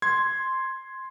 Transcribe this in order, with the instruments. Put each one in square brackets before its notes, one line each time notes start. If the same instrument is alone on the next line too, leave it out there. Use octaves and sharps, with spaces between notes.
[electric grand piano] C6 G#6